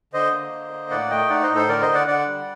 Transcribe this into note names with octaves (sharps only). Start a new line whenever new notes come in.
D3 C5 D#5
A#3
D3
A#3
A2 D5 F#5
A3 D#5 G5
D#4 D5 F#5
C5 D#5
A2
A4 C5
D3 A#4 D5
C5 D#5
D3
D5 F#5
D3 D5 F#5
G3